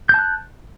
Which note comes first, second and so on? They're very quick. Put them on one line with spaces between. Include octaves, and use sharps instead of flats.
G6 A5 F#6